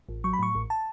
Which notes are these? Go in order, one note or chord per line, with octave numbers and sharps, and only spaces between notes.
A1
F#3 C#6
B5
A2 C#6
A1
A5